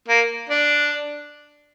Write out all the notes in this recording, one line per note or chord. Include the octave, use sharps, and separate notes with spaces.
A#3
D4